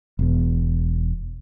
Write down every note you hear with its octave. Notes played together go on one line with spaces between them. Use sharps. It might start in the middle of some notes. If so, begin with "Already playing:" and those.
E1 E2